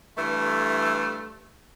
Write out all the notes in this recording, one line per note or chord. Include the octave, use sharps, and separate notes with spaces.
G2 E3 A3